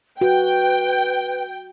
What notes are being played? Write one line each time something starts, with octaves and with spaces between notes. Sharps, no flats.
F#4 B4 G5